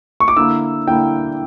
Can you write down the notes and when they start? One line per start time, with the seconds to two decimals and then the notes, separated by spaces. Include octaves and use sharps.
0.20 C#6
0.28 D6
0.37 D3 A#3 E4 E6
0.87 D3 A#3 E4 G5